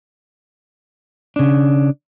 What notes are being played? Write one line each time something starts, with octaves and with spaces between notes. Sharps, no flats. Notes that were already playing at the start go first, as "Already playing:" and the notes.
C#3 D4